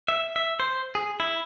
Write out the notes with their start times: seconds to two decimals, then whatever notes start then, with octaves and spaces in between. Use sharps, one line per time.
0.08 E5
0.36 E5
0.60 C5
0.95 G#4
1.20 E4